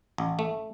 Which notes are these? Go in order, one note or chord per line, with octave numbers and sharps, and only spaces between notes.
A1
A3